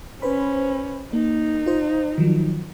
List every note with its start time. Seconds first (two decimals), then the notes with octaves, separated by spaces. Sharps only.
0.22 C#4 B4 C5 B5
1.13 A#3 D#4
1.66 F4 C5
2.18 D#3 F3 F#3